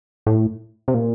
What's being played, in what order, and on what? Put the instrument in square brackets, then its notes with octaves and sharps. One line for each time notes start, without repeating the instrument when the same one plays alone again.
[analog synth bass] A2
C3
A#2